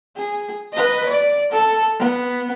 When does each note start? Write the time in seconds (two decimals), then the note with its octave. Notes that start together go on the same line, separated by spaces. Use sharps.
0.16 G#4
0.73 B4 D#5
1.06 D5
1.52 A4
1.99 B3